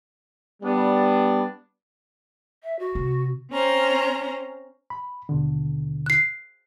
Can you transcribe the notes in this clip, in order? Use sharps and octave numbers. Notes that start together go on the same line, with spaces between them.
G3 B3 D4
E5
F#4
C3
C4 C#4 C5 A#5
B5
D#2 B2 D3
F#6 C7